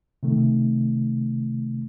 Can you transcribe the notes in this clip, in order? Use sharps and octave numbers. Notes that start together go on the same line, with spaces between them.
C3 D#3 A3